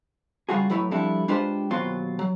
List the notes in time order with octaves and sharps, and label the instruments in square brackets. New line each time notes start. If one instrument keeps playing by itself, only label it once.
[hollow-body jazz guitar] C#3 G3 F4 F#4 G#4
A2 F#3 E4 B4 C#5
F3 G3 C4 D4 E4 A4
G#3 D4 F4 G4 B4 C5
D#2 B2 F#3 C4 F4 C6
F#3